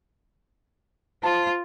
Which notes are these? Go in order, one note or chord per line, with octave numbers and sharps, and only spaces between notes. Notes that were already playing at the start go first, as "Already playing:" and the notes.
F4 C5 A5